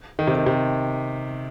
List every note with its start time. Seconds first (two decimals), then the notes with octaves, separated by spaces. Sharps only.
0.19 D#3
0.27 C3
0.35 D#3
0.46 C3